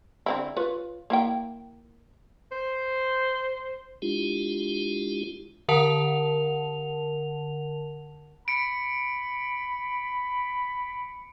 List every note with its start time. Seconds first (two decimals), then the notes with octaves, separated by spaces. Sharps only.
0.26 D3 C4 E4
0.56 F4 B4 C#5
1.10 A#3 E4 G5
2.52 C5
4.02 G#3 D4 E4 F4 G4
5.68 D3 A#4 F#5 A5 F7
8.48 B5 C#7 D7